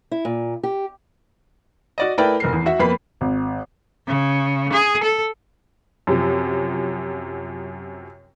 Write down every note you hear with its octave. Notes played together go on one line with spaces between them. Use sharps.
E4
A#2
G4
F#4 D5 D#5
A3 E4 A#4 B4 D5 G5
F1 A#4 C7
E2
F#4 E5 F#5
F2 A#3 B3 B4 B5 C7
G#1
C#3
G#4
A4
F#2 C3 F3